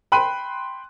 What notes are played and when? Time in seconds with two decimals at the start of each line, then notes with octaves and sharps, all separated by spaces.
0.12 G5 B5 C6 F#6 D#7